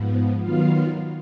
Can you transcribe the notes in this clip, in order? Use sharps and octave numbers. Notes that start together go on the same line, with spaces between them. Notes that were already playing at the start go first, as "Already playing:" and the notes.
Already playing: G#2 F3 B3
D#3 F#3 B3 F4 F5